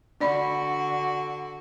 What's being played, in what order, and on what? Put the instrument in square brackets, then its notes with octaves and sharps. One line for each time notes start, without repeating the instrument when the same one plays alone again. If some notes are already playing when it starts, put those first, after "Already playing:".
[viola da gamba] D3 F#4 [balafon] D4 D5 B5